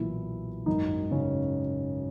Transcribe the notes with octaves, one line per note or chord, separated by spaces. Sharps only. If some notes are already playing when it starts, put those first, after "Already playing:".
Already playing: B1 A#2 E3 E4
G#1 F#2 D#3 D#4
C#3 C#4